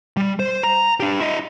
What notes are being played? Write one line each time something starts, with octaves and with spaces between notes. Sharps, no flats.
G3
C5
A#5
D4 G4
E4 D#5